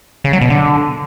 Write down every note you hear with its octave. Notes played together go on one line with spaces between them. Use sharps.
C#3
F#3
B2
D3